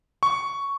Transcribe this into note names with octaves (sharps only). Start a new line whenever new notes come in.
C#6